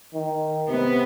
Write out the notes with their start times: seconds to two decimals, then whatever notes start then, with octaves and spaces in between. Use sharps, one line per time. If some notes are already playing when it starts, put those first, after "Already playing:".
0.14 D#3
0.69 C3 B3